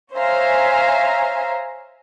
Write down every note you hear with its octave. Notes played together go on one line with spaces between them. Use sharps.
C5 C#5 E5 F5 G#5 A#5